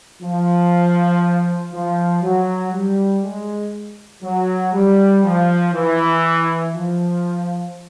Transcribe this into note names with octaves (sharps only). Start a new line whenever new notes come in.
F3
F3
F#3
G3
G#3
F#3
G3
F3
E3
F3